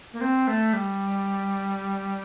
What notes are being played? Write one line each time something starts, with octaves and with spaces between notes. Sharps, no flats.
A#3
C4
A3
G3